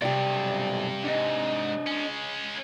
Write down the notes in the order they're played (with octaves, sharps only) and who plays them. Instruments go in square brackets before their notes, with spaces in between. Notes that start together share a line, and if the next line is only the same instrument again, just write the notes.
[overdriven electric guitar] B1 D5 [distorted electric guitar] G2 [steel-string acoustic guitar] C3 G4
[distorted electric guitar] G#2 [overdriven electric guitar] D4 D#5
[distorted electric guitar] G#3 C#4